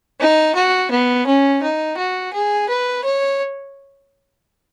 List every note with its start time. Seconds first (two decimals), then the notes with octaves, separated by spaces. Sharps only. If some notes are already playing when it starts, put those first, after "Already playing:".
0.20 D#4
0.55 F#4
0.91 B3
1.26 C#4
1.62 D#4
1.98 F#4
2.33 G#4
2.69 B4
3.04 C#5